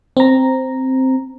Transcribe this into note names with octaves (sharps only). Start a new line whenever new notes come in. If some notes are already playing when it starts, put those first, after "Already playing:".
C4 A#5